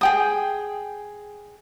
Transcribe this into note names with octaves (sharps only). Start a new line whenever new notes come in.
G#4 G5 D#6